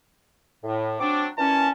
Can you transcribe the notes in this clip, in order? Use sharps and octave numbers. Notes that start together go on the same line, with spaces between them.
A2
F#3 C4 D4 D6
A#2 E3 C#4 A5